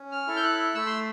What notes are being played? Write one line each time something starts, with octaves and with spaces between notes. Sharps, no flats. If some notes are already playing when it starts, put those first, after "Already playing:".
Already playing: C#4
F6
E4 A4
G6
F#6
A3 E6
C6